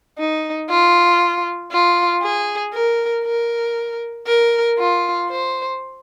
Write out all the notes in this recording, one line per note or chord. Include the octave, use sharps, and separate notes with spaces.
D#4
F4
F4
G#4
A#4
A#4
A#4
F4
C5